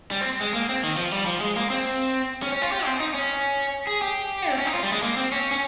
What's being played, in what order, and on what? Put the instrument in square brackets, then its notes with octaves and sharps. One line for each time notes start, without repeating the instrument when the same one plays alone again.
[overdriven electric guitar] G3
C4
G#3
A#3
C4
D#3
F3
G3
F3
G#3
A#3
C4
C#4
C#4
F4
G4
C4
D#4
C#4
G#4
G4
C4
C#4
D#4
F4
G3
G#3
A#3
C4
C#4
C#4